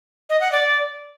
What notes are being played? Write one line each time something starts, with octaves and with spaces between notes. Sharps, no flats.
D#5
F#5
D5